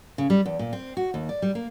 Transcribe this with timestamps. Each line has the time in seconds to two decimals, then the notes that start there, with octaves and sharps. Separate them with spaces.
0.18 C#3
0.30 G3
0.46 E2
0.59 A#2
0.73 C4
0.97 F#4
1.14 D#2
1.29 D5
1.42 G3
1.55 A#3